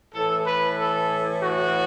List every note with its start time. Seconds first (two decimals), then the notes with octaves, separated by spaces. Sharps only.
0.14 A2 E3 A4
0.47 B4
0.79 A4
1.43 F#4